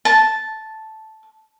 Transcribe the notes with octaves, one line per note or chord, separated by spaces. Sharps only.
A5